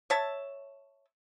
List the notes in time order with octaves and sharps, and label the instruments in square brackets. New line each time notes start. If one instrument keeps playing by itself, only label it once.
[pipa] C#5 E5 A5